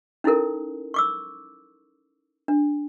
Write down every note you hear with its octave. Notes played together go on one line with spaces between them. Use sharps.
C#4 D#4 E4 A4 A#4
C#6 D6 E6
D4